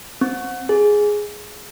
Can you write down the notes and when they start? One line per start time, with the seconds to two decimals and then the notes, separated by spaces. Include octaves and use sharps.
0.21 C4
0.69 G#4